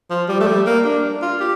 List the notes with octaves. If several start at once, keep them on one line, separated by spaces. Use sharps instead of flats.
F3
G3
A3
G3
A#3
D4
F4
G4